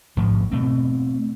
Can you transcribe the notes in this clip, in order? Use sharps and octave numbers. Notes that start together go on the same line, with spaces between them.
A1 G#2 D3 F3
B2 A3 C4